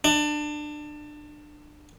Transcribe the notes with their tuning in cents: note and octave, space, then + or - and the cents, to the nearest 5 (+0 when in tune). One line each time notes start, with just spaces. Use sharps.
D4 +25